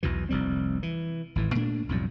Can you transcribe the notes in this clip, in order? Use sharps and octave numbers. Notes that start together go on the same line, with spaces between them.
B1 E2 B2 E3
F1 C2 G3 C4
E3
G#1 A2 E3
A#2 A3 D4
B1 F2 A2 G3